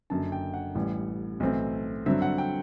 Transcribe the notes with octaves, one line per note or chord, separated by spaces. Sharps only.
F#1 F#2 D3 A5
G5
F#5
A1 A2 E3 G3
B1 A2 E3 A3 C4
G2 D3 F#3 C4 E5
F#5
G5